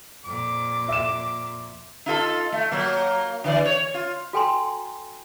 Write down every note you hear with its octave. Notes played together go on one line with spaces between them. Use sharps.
F2 A#2 D6
E5 E7
D#4 F4 A4
A3
F#3 A#3
D3 E3 D5
C#5
F4
F#4 A4 G5 G#5 A#5 C6